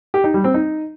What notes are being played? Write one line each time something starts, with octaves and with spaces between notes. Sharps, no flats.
G4
D#4
G3
C4
D#4